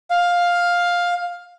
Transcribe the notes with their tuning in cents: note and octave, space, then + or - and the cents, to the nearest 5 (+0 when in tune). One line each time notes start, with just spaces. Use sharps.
F5 +10